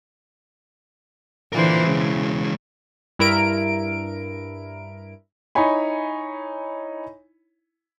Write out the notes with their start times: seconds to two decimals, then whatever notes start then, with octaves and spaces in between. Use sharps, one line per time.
1.53 D3 E3 F4 A#4 C5
1.83 C#3 E3 G#3
3.19 G2 E4 A#4 D7
5.55 D#4 E4 C#5 G#5 B5